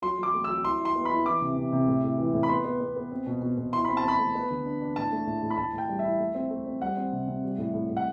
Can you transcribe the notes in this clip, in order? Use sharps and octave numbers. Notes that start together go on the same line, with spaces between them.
F#3 C6
F#3
D6
A3
F#3 E6
E4 C6
E4
C6
B3
B5
E4
E3 D6
C3
C3
C3
A2
A2
E3
A2
B5
B3 C6
B3
B3
B3
C4
B2
B2
B2
E4 C6
C4 B5
A5
C4 B5
A3
B3
D3
D4
D4
A2 A5
A3
A2
A2
B5
A2 A5
A2 G5
G3
E4 E5
A3
C4
A3
C4
G3 F#5
C4
C3
C3
G3
A2
A2
A2
F#5